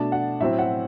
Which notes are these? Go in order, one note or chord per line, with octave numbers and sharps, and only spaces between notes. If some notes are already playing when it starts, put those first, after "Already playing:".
Already playing: B2 A3 D4 A5
F#5
A2 F#3 C4 E5
F#5